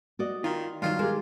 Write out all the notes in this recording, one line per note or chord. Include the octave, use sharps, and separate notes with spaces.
F#4 D5 D#5
D#3 F4
G2 D#3 F#3 F4
G#3 G4 G#4 A#4